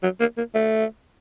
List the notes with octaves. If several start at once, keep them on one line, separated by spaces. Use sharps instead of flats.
F#3
A#3
A#3
A3